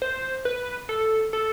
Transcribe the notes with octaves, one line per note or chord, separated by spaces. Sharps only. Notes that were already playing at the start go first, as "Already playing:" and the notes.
C5
B4
A4
A4